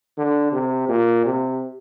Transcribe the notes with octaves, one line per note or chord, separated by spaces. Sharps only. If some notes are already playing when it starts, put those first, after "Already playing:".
D3
C3
A#2
C3